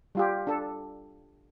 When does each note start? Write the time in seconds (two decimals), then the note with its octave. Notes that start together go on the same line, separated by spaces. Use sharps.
0.15 G3 F4 G4
0.47 D4 A4